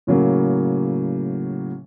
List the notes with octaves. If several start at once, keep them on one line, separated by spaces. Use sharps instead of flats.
A2 C#3 F#3 A#3